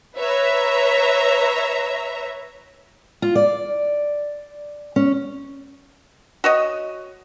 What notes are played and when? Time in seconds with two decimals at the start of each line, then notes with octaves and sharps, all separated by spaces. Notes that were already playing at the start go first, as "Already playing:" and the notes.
0.19 B4 C#5 E5 A#5
3.22 F4
3.35 D5
4.96 C#4
6.44 F#4 C#5 D#5